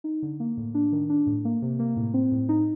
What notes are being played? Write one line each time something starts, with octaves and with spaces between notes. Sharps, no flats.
D#4
D3
A#3
A2
D4
D#3
D4
A2
A#3
C3
A#3
A2
C4
A2
D#4